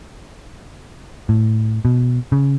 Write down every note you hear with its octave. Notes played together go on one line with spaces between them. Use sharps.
A2
B2
C#3